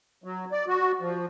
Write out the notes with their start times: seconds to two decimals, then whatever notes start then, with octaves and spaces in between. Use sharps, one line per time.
0.24 F#3
0.52 D5
0.68 F#4
1.00 F3